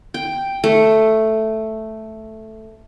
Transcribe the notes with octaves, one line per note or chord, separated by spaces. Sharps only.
G5
A3